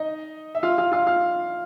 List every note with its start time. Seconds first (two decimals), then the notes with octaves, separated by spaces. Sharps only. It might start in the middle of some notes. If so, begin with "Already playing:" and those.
Already playing: D#4 D#5
0.55 E5
0.63 F4 F5
0.78 F4 F5
0.92 F4 F5
1.06 F4 F5